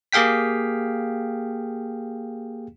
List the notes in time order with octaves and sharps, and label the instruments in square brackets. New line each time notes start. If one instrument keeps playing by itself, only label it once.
[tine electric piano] A#3 G4 G#4 F5 G5 B6